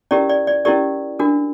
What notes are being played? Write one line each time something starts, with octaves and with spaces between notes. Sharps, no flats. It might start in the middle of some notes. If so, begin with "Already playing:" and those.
C#4 E4 G4 A#4 D5
D5
D5
C#4 E4 G4 A#4 D5
D4 F#4 A#4